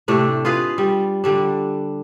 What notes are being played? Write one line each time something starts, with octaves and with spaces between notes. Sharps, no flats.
A2 C3 A3 D4
F4 G#4 B4 F5
G3
D3 G3 D4